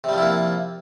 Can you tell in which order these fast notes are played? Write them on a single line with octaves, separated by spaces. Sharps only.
C3 G3 F3 E4 A#3